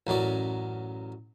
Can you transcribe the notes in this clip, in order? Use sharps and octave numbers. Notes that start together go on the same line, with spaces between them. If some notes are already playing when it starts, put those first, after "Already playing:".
A1 F#2 F#3 D5